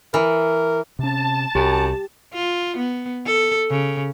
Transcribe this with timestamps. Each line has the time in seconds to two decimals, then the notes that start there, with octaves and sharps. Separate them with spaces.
0.14 E3 A#4
0.99 C3 C#4 A5
1.55 C2 F#2 G4
2.34 F4
2.77 B3
3.26 A4
3.70 C#3